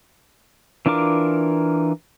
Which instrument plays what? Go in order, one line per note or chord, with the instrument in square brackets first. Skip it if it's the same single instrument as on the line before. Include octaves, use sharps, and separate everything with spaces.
[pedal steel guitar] E3 D4 F4 A#4 D6